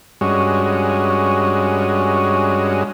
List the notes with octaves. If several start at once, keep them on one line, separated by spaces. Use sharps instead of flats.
G2 G#3 C#4 F#4